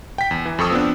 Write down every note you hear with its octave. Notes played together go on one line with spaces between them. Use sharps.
G5 B6
E2
E3
F2 A4 C#6 D#6 E6
F3 B3 C4 D4